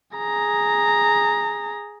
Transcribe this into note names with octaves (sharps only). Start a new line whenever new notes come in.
G#4 A#5